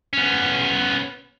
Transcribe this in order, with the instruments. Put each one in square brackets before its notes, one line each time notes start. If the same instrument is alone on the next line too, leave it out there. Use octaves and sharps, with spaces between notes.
[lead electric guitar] B3 C#4